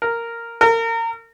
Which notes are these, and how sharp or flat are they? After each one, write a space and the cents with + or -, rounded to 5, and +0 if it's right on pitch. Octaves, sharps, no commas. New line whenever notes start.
A#4 -5
A#4 -30